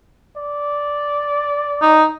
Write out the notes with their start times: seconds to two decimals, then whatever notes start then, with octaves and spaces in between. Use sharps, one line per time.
0.37 D5
1.82 D#4